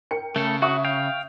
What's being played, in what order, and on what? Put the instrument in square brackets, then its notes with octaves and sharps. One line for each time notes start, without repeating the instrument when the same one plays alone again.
[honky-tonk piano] A#4 G5 C#7
[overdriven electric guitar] C#3 [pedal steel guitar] A3 A4
[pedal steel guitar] F#4 [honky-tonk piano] E5 C#6 D#6
[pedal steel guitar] F5 G5